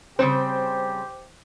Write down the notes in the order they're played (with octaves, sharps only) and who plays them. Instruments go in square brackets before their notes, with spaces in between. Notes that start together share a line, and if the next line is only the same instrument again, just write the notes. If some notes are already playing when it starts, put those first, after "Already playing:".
[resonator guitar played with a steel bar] C#3 G3 C4 [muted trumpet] G4 [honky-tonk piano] C5